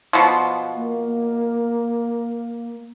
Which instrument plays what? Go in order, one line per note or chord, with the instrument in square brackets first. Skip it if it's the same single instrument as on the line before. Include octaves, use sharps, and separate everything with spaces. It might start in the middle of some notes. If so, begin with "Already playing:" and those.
[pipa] B2 F3
[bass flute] A#3